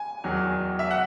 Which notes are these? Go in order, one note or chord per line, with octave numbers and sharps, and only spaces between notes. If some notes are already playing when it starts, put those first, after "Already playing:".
Already playing: G#5
E2 D#3 F#3
E5
F#5